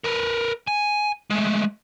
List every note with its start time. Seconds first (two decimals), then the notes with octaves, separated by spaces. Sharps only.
0.04 A#4 B4
0.67 G#5
1.30 G#3 A3